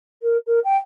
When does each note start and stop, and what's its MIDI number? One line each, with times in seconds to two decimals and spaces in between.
0.22 0.37 70
0.46 0.59 70
0.64 0.77 79